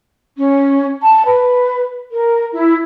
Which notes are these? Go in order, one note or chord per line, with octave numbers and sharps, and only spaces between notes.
C#4
A5
B4
A#4
E4